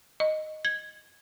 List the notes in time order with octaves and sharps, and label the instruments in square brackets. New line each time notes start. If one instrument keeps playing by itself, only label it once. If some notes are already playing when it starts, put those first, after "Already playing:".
[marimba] D#5
G#6